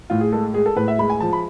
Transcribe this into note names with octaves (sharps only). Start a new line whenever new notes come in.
A2 F4
G#4
G#3 A4
G#3 G#4
A4
A2 B4
E5
G#3 B5
G#5
F3 A5
B5